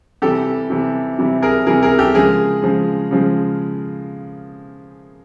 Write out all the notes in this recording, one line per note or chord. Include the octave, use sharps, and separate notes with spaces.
C3 E3 G3 G4 A4
C3 E3 G3
C3 E3 G3
G#4 A#4
C3 E3 G3 G#4 A#4
G#4 A#4
G4 A4
C#3 F3 G#3 G#4 A#4
C#3 F3 G#3
C#3 F3 G#3